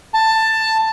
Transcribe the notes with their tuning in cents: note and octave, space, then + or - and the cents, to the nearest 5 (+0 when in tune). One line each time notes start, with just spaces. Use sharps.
A5 +10